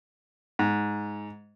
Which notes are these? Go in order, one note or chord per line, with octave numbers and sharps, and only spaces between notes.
G#2